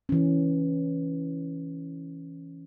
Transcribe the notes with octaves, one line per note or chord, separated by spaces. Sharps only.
E3 C#4